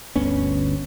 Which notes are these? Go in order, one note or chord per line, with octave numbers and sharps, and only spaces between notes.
G1 D2 B3 C#4